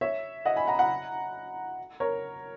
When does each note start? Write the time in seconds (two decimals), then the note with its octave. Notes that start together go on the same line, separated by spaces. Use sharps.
0.01 C#5 E5
0.45 D#5 F#5
0.56 G#5 B5
0.67 F#5 A#5
0.79 F#5 A#5
2.00 A#4 C#5